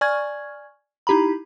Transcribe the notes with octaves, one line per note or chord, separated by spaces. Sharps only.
D5 G#5 C#6 F6 G#6
D#4 E4 G4 A#5 B5